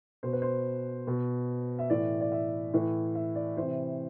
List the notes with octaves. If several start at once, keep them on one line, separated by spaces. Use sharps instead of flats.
B2 C5
B4
C5
B2
E5
A2 E3 D5
D5
E5
A2 E3
E5
D5
C3 E3 C5